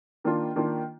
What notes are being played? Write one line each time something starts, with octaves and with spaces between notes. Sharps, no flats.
D#3 A#3 D4 F4
D#3 A#3 D4 F4